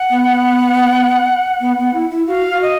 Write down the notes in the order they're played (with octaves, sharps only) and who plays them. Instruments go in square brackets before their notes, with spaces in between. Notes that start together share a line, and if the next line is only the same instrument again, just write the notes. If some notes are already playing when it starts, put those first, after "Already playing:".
Already playing: [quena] F#5
[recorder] B3
B3
B3
E4
E4
[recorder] F#4 [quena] F5
[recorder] F#4
[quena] D#5